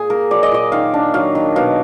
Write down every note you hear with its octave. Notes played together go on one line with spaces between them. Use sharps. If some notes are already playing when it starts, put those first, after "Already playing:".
Already playing: A#2 G#4
A#3 A#4
F#3 D5
D#5
A#2 D5
D#3 F5
D4
F#3 F5
D#3
B2 F5